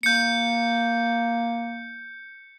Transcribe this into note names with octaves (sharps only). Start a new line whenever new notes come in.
A#3 G6 C#7